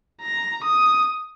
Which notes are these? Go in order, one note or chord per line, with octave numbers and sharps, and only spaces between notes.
A#5
D#6